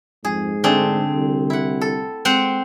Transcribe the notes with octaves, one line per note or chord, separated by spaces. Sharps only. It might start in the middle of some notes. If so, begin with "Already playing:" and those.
F2 G#2 G#4
D3 A3 C4 D4 G#4
C2
E4 F#5
A4
G#3 C4 C5 F#5